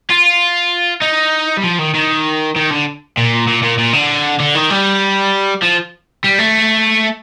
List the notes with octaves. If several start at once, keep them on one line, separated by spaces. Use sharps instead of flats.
F4
D#4
G3
F3
D#3
D#3
D#3
D3
A#2
A#2
A#2
A#2
D3
D3
D#3
G3
F3
G3
A3